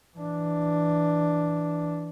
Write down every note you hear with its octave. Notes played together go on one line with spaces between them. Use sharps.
E3 D4